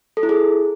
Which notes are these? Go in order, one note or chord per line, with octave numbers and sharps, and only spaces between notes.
A4
E4
G#4